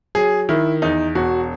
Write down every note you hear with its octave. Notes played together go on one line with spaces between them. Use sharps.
F#3 G#4
D#3 E4
E2 D#4
E1 F#4